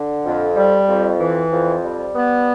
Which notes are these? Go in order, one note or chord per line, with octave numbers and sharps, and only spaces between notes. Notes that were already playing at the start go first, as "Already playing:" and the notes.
Already playing: D3
F2
G3
F2
E3
F2
G3
B3